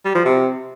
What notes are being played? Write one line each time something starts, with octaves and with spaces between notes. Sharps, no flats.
G3
F3
C3